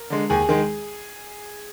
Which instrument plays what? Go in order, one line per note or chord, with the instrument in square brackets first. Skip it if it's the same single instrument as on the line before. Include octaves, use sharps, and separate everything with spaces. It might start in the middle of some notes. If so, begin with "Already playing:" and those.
Already playing: [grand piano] A#4
D3 G#3
D#2 G#4 G#5
D#3 G#3